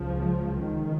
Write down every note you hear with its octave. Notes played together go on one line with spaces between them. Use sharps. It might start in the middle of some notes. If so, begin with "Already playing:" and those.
Already playing: C#2 C#3 F3
D#3